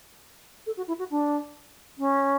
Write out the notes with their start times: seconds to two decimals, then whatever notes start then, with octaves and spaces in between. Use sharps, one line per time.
0.66 A4
0.77 F#4
0.88 E4
0.99 F#4
1.10 D4
1.98 C#4